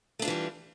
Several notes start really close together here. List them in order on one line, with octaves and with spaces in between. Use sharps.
A3 D4 F4 E3 G3